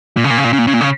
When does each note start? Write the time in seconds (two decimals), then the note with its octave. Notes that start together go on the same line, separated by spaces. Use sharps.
0.17 A#2
0.24 C#3
0.30 A#2
0.38 C#3
0.44 A#2
0.53 C#3
0.59 A#2
0.67 C#3
0.74 A#2
0.81 C#3